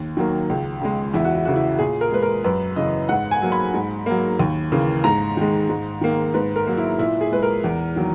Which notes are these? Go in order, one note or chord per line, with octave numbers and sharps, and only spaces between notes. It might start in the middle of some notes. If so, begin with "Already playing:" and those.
Already playing: D#2
D#3 F#3 A#3
C#2
C#3 G#3
E2 E4
F#4
E4
C#3 E3 F#4
E4
A#2 G#4
A#4
G#3 B4
A#4
F#2 B4
C#3 E3 D#5
G#2 F#5
G#5
F#3 A#3
B5
G#2
F#3 A#3
D#2
C#3 E3 A#3
G#2 A#5
D#3 G#3
G#2
D#3 A#3
G#2 B4
A#4
F#3 A#3
E4
A#2 E4
G#4
G#3 B4
A#4
E2
D#3 F#3 A#3